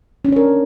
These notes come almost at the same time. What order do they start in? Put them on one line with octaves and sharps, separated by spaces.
C#4 D4 C#5 A#4